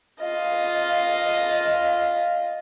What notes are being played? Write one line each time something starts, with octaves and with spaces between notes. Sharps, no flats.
F4 D#5